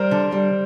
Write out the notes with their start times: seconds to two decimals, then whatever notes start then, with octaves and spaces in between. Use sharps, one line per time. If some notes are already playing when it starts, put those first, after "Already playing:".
Already playing: G3 A#4 C5
0.11 D3
0.32 G3